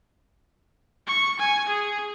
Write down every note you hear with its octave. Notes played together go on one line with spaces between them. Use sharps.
C#6
G#5
G#4